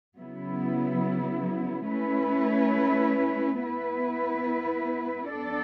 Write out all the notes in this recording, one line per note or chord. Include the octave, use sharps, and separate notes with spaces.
C#3 F#3 B3 E4
A3 C#4 E4 B4
B3 E4 B4
B3 D4 A4 D5